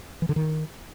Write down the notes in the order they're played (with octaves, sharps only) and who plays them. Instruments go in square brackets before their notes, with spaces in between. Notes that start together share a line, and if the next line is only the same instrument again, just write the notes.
[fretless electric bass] E3
D3
D#3